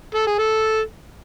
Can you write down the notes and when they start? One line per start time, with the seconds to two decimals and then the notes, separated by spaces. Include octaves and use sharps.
0.15 A4
0.27 G#4
0.38 A4